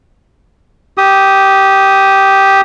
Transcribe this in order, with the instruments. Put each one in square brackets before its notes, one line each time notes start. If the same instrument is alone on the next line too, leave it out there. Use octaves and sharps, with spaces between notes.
[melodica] G4 D#6